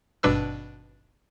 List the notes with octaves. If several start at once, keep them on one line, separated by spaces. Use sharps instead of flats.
G#1 G2 B2 D4 B4 E6